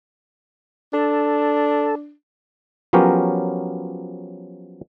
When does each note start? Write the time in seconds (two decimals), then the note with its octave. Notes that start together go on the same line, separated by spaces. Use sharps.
0.93 D4 A4
2.93 F3 F#3 B3 C#4 G4 A#4